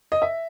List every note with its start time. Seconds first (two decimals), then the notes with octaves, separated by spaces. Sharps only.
0.12 D#5
0.22 E5